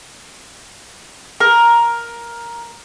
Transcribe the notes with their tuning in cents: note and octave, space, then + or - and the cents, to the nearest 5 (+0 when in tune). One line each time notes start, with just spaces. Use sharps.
A#4 +10